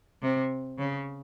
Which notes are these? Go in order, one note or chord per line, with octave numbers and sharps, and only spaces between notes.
C3
C#3